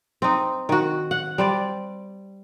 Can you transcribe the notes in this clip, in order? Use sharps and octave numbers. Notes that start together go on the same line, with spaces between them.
C4 D#4
D#3 F#4
F#5
G3 C5 D5